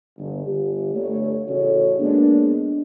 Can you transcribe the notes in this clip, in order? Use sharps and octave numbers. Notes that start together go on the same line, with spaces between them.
G1
G1 G4
G1 A3 C#5
A1 C#3 F#4 A4 C#5
G#3 A#3 B3 D4